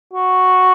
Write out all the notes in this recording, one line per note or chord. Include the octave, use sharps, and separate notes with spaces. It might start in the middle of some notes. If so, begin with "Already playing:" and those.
F#4